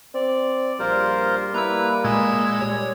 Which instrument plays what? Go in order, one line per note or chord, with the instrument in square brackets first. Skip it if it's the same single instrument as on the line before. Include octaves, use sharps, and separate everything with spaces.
[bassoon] C4 [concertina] D5
[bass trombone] A#1 [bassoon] G3 [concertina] F4 A#4 C5
[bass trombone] A#3 [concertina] E4 B4 [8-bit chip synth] A#5 E6
[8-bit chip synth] A#2 G#3 G#6 [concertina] G#4 E6
[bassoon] G3 [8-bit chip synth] C#5